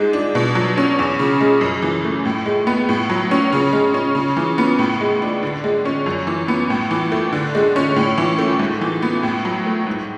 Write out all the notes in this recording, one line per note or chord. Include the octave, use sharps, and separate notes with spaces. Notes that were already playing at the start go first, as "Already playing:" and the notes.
Already playing: G#2 G#3
D4
B2
F#3
C#4
E2
C#3
G#3
F#2
E3
A3
A2
G#3
B3
A2
F#3
C#4
C#3
G#3
C#4
C#3
E3
B3
A2
G#3
D4
D3
G#3
C#4
F#2
E3
B3
A2
E3
A3
D3
G#3
C#4
A2
E3
A3
G#2
E3
B3
A2
F#3
A3
G#2